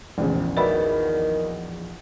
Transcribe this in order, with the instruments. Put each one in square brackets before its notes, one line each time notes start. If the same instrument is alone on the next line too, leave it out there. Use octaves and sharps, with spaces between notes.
[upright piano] F1 C#3 [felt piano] A#1 E2
[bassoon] D#3 [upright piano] F#4 D5 E5 [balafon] B4 B5